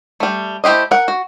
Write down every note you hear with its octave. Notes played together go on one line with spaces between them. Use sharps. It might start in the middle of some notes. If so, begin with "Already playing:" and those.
G3 A3
A3 E4 G4 C5 D#5
A#4 F#5
F#4